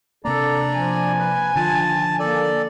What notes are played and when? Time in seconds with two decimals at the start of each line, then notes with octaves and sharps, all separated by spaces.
0.25 C3 A#3 D4 A4 D5 A#5
0.72 F3 G#5
1.19 B4
1.56 D3 D#3 F3 F4 A5
2.19 A#3 A4 D5